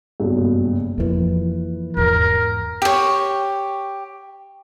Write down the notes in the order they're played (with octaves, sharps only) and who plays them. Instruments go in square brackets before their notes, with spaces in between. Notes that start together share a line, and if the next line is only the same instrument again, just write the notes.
[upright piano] F#1 B1 G2
[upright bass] F2 E3 [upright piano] A#3 E4 B4
[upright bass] E2 G#2 [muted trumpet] A#4
[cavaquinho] G4 C#5